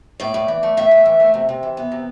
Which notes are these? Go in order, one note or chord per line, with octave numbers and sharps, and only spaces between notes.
A2 D5
A2
E3
A3
A2 E5
A2
E3
A3
C3
C3
E3
B3
C3